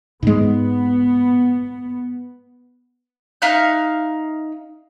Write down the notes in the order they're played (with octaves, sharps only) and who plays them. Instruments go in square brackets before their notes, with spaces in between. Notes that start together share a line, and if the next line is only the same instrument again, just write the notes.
[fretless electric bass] G#2 G#3 [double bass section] B3
[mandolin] D#4 E5 F5 F#6